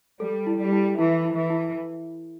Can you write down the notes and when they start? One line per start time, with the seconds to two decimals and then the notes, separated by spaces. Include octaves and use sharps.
0.20 G3 A4
0.47 E4
0.60 G3
0.72 E4
0.99 E3 E4
1.25 E4
1.38 E3
1.50 E4